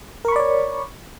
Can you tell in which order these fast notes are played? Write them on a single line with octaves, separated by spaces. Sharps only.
A#4 C#6 B5 D5 C#5